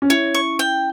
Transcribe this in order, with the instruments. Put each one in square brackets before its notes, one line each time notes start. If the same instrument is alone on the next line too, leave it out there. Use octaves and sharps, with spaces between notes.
[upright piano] C#4
[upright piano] E4 [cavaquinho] C#5
[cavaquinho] C#6
G5